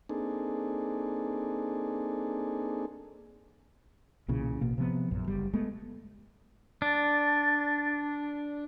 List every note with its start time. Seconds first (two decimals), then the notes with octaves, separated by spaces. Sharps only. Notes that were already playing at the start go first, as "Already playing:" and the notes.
0.09 A#3 C4 D4 D#4 G#4 A4
4.28 B1 A#2 C#3 E3
4.61 A1 B2 A#3
4.78 C3 F3 B3
5.11 A#1 F#2
5.27 F#1 G3
5.53 G#3 A3 B3
6.82 D4 A6